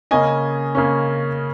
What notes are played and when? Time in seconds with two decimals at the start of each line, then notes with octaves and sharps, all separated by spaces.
0.11 C#3 A#3 C#4 D#5 G#5
0.75 C#3 A#3 C#4